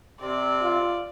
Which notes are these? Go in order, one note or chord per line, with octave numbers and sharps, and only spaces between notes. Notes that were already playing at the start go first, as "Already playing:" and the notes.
C3 C4 D5
F4